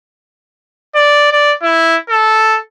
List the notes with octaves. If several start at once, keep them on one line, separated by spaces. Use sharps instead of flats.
D5
D5
E4
A4